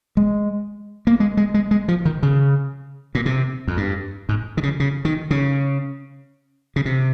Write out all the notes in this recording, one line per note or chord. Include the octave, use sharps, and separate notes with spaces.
G#3
A#3
G#3
G#3
G#3
G#3
F3
D#3
C#3
A#2
C3
F2
G2
G#2
D#3
C#3
C#3
D#3
C#3
C#3
C3